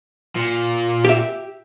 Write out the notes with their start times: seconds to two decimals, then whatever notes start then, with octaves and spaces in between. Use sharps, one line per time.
0.36 A#2
1.05 G4 E5